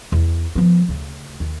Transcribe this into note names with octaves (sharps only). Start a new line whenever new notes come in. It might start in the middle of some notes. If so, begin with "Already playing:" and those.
E2
F3 B3
D2 C#3
D#2